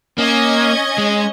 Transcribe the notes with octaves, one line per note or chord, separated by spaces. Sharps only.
A#3 C#4 D#5 G#6
G#3